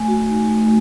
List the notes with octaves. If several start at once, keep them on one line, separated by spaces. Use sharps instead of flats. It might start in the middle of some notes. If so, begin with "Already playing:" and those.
Already playing: A3 G#5
F#4
D#4
A3